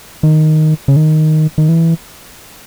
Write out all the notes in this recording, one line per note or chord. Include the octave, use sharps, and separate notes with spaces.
D#3
C#3
D#3
D#3
E3